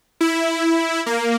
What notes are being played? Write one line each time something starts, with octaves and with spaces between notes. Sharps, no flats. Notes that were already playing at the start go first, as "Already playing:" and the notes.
E4
A#3